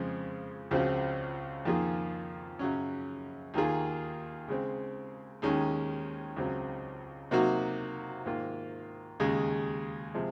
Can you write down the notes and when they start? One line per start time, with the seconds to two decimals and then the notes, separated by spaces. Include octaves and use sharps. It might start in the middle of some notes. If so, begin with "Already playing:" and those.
Already playing: F2 C#3 G#3 C4
0.71 C#2 C#3 F3 C4 F#4
1.65 F2 D#3 A#3 F4 G#4
2.59 F#2 C#3 F#3 C#4
3.54 D#2 D#3 A#3 F4 G#4
4.48 C#3 G#3 C4
5.42 D#2 D#3 G#3 C#4
6.36 C#2 C#3 F#3 C4
7.31 C3 F#3 A#3 D#4 F#4
8.26 G#2 D#3 A#3 F4
9.20 D#2 C#3 G#3
10.15 C3 F3 G#3